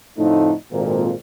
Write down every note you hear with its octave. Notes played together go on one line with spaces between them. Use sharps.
F2 A2 D3 F3 A3 D#4
G#1 F2 A#2